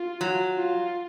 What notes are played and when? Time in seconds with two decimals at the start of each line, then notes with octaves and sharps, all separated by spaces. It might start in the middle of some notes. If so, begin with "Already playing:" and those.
Already playing: F4
0.21 F#3
0.57 F4